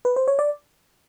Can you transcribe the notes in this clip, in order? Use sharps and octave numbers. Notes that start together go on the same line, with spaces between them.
B4
C5
C#5
D5